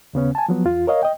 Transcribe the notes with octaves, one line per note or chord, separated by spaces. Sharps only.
D#2 C#3 B3 C#4
G#5 A5
F3 F#3 B3
E2 F4
A#4 C#5 D#5 F5
D#5 G5